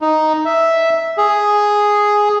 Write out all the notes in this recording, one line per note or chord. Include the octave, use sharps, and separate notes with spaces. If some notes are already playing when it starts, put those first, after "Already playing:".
D#4
E5
G#4